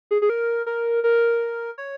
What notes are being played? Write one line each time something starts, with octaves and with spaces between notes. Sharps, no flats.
G#4
G#4
A#4
A#4
A#4
C#5